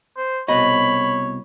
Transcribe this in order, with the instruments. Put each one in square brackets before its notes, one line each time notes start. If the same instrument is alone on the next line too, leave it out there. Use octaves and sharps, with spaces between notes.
[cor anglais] C5
[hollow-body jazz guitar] C2 B2 D#5 [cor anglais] C#5 [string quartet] B5